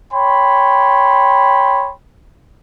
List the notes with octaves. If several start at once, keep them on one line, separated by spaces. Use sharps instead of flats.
C#5 G5 B5 C6